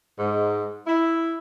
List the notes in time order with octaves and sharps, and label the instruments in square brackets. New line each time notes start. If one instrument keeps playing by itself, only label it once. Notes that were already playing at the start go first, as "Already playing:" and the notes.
[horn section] G#2
E4